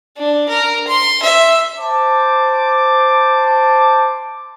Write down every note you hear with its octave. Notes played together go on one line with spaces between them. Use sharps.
D4
A#4
C6
E5
C5 A5 D6